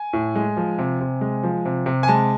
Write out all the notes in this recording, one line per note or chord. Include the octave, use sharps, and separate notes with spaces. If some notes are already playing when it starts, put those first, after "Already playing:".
Already playing: G#5
A2
G#3
F3
C3
C3
G#3
F3
C3
C3
G#5
G#3 A5